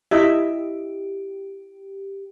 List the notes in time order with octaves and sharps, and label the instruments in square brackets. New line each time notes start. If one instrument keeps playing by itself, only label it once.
[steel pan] E4 D#5 E5 [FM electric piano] G4